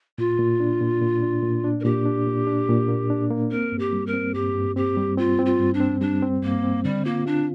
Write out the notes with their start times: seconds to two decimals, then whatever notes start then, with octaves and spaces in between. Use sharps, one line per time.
0.18 A#2 F4
0.39 A#2
0.60 D4
0.81 A#2
1.02 A#2
1.23 D4
1.43 A#2
1.64 D4
1.80 A#4
1.84 A#2 G4
2.06 D4
2.27 A#2
2.47 D4
2.69 A#2
2.88 A#3
3.10 D4
3.31 A#3
3.51 C4 A#4
3.72 G2
3.79 G4
3.93 G3
4.07 A#4
4.13 C4
4.34 G2 G4
4.55 G2
4.76 C4 G4
4.97 G3
5.17 C4 F4
5.39 C4
5.46 F4
5.60 G2
5.74 D4
5.80 C4
6.01 G3 D4
6.22 C4
6.43 G2 A#3
6.63 C4
6.84 D3 G3
7.05 A#3 F4
7.26 D4 F4